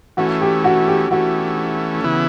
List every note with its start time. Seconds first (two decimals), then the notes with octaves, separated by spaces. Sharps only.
0.17 E3 A3 C#4 F#4
0.41 G4
0.64 F#4
0.88 G4
1.10 E3 A3 C#4 F#4
2.04 C#3 E3 B3 E4